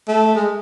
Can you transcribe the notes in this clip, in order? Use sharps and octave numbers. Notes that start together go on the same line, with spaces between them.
A3
G#3